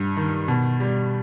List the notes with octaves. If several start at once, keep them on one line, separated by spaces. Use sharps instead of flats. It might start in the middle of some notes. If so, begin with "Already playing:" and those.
Already playing: G2 G3
D#3
B2
G3